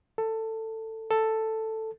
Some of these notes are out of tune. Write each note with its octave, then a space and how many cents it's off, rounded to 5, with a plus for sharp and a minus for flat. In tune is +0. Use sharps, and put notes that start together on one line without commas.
A4 +15
A4 +5